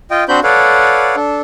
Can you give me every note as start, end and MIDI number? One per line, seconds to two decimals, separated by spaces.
0.11 0.24 65
0.11 0.24 75
0.11 0.24 79
0.29 0.40 60
0.29 0.40 62
0.29 0.40 66
0.29 0.40 72
0.29 0.40 83
0.29 0.40 91
0.44 1.16 69
0.44 1.16 71
0.44 1.16 73
0.44 1.16 74
0.44 1.16 77
0.44 1.16 78
1.16 1.42 62
1.16 1.42 69